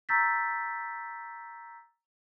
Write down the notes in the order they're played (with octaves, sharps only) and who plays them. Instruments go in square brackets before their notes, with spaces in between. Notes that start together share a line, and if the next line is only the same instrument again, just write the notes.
[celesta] A#5 C#6 E6 G6 A6 B6